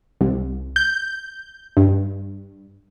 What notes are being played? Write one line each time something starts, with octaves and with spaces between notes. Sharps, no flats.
C2
G6
G2